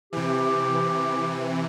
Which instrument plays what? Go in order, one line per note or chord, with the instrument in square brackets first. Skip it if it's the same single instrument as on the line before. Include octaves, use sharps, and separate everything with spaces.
[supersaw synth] C3 E3 [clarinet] G4